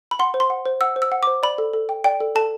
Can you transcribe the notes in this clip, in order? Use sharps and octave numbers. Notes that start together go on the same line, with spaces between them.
B5
F#5 C6
C5
C6
F#5
C5
F#5 E6
C5
E6
F#5
C5 D6
D5 B5
A4
A4
G5
D5 G5
A4
A4 A5